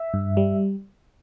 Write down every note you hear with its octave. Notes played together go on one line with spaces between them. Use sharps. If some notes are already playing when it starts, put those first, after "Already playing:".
Already playing: E5
G2
G3